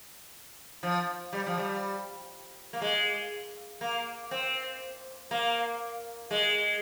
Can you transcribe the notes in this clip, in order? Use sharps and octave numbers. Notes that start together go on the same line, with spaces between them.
F3
G3
F3
G3
A#3
G#3
A#3
C4
A#3
G#3